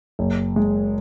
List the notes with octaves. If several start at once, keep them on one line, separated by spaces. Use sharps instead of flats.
F#1
G#3